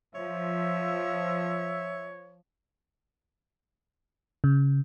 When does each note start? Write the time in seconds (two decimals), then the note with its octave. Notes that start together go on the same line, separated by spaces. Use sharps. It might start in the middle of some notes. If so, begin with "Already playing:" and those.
0.15 F3 C#5 E5
4.44 C#3